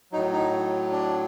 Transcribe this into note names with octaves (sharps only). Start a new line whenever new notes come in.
A2 F#3 D#4
D#4
D4